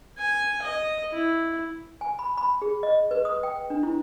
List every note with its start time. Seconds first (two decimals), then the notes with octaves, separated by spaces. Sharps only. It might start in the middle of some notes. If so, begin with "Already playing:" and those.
0.18 G#5
0.63 D#5
1.12 E4
2.01 G#5
2.19 B5
2.37 B5
2.62 G#4
2.83 D#5
3.11 B4
3.25 D#6
3.43 G5
3.70 D4
3.83 E4